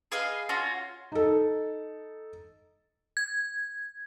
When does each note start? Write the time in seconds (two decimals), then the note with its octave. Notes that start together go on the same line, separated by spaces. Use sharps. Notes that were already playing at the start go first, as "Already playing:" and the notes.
0.12 G#4 B4 D#5 F5
0.49 C#4 F4 F#4
1.12 D#4 A4
3.17 G#6